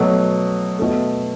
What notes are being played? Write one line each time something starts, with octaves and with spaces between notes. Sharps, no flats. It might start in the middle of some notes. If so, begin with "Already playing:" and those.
Already playing: B2 F#3 A3
B2 A3